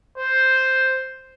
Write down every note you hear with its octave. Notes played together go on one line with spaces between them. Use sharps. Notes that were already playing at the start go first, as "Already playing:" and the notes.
C5